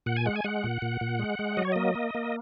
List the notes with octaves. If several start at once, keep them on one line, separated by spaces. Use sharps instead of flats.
A#2 F#5
G#5
G#3 F#5
G#5
G#3 F#5
A#2
A#2
A#2
G#3
G#3
F#3 D#5
C#5
A#3 D#5
A#3
A#3